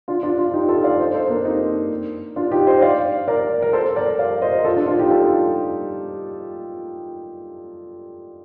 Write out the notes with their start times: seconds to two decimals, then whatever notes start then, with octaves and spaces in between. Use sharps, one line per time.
0.08 D4 F4
0.23 D4 F4
0.38 D4 F4
0.54 D#4 G4
0.68 F4 A4
0.84 D5 F5
0.99 C5 D#5
1.14 A4 C5
1.30 A#3 D4
1.45 C4 D#4
2.36 D4 F4
2.51 D#4 G4
2.67 C5 D#5
2.82 D5 F5
3.28 A#4 D5
3.62 A#4
3.73 A4 C5
3.96 A#4 D5
4.19 D5 F5
4.42 C5 D#5
4.58 A#4
4.65 F4 A4
4.76 D4 F4
4.87 D4 F4
4.99 D#4 G4
5.10 F4 A4